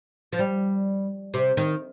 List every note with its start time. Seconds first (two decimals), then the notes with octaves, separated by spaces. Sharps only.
0.32 F3
0.39 G3
1.34 C3
1.57 D#3